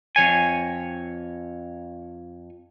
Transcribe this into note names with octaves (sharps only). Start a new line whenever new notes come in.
F2 D#3 C#5 G#5